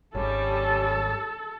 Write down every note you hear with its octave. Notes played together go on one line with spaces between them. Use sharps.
G#1 G3 C#4 A4